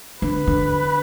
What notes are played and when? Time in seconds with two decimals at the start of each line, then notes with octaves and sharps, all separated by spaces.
0.22 D3 B4
0.47 D3